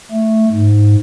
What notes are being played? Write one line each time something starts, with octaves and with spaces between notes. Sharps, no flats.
A3
G#2